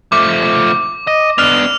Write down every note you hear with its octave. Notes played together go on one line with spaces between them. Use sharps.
F3 A3 D6
D#5
B3 D4 F6 F7